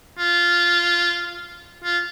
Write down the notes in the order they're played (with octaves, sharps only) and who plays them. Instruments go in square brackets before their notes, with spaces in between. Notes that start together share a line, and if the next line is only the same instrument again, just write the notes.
[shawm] F4
F4